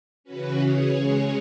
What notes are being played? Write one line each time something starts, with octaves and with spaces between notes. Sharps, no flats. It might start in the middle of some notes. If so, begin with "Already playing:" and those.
C#3 E3 C#4 F#4 B4
G#4 C#5
C#3 G#3 C#4 G#4 C#5